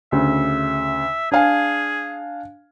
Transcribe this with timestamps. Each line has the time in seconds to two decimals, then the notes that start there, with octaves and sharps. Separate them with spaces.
0.12 D2 C#3 E5
1.32 D4 G#4 F5 G#5